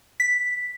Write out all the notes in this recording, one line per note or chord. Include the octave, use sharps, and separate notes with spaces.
B6